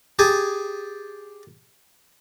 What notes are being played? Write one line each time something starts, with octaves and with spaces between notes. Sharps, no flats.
G4 G#4 G#5 A5